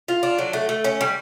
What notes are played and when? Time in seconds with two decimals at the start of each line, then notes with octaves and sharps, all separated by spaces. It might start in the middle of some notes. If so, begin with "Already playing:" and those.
0.08 F4
0.23 D4
0.39 F#3
0.53 A3
0.69 A3
0.84 C#4
1.01 G3